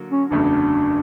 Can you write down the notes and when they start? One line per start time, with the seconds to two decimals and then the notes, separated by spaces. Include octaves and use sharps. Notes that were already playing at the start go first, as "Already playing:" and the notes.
Already playing: D3 F#3 A#3
0.10 C#4
0.30 F#1 E2 C#3 F#3 A3 D4